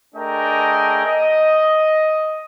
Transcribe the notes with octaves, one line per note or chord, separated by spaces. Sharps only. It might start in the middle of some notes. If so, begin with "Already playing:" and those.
A3 D4 G#4 A#4 D#5 G5
D#5